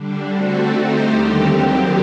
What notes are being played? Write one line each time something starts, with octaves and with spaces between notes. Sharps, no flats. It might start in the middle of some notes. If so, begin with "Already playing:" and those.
Already playing: D3 G3 D4
D3 A3 C4 F#4 A4
A3 D#4 G4 C5
D#2 D3 G3 C4 G4
D#2 D#3 F#3 C4 G4